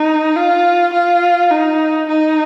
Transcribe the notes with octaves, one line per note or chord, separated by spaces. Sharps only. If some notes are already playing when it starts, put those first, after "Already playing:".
Already playing: D#4
F4
F4
D#4
D#4